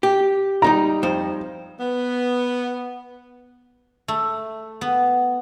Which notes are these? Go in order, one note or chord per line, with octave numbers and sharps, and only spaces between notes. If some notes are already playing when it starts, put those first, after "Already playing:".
G4
G3 D#4 A#5 D6
F2 C5
B3
A3
B3